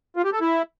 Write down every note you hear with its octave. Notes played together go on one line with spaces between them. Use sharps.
F4
G4
A4
E4